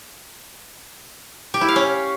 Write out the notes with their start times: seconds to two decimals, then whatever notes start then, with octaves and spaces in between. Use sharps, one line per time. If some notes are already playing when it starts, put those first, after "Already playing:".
1.54 G4
1.61 E4
1.69 F5
1.76 C#4